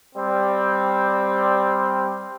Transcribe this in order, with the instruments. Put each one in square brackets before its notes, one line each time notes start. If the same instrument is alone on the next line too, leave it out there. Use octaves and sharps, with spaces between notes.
[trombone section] G3 C4